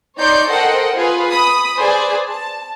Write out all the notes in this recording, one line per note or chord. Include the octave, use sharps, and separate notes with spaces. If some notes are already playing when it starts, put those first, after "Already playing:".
D#4 C#5 D5 C6 G6
A4 A#4 C5 D#5 F#5 G5
F4 G#4 B4
B5 D#6
G#4 B4 C5 D5
A5